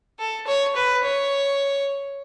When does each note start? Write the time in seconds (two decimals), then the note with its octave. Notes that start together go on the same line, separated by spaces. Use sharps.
0.20 A4
0.47 C#5
0.76 B4
1.03 C#5